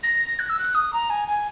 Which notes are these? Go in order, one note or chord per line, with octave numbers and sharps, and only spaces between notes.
A#6
F#6
E6
F#6
D#6
A#5
G#5
G#5